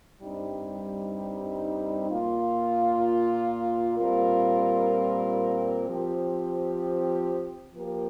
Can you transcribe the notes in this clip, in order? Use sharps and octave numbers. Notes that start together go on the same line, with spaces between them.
G2 G3 C4 D#4
A#2 A#3 F4
A#2 G3 C4 F4 A#4
F3 C4 G4
F3 A#3 G4 A#4